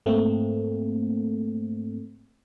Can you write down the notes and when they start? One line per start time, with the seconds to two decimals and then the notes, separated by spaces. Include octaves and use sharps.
0.06 G#2 A3 A#3 C4